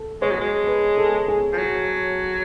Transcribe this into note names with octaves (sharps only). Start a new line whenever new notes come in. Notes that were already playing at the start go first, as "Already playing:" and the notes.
Already playing: A4
G#3 C#5
F#3
G#3
B4
A4
G#4
F3
F#3